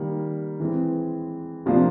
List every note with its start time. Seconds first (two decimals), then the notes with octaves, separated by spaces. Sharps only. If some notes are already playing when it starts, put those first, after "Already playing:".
Already playing: D#3 G3 A#3
0.60 E3 G#3 C4
1.66 C3 F3 A#3 D4 F4